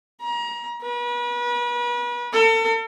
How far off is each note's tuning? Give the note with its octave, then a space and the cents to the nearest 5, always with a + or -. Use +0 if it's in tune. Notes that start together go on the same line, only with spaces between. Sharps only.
A#5 +30
B4 -35
A4 +40